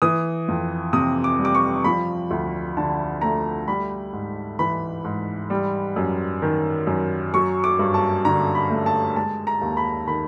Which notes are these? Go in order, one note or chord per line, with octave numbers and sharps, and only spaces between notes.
E3 D#6
F2
C3 D#6
D6
G3
D6
C#6
F3 B5
D2
D3 A5
A3 A#5
G3 B5
G#2
E3 B5
G#2
G3
F#2
D#3
F#2
F#3 C#6
D6
G2
A5
D3 A#5
B5
A3
A5
G#3 A5
A#5
D#2
B5
D#3 B5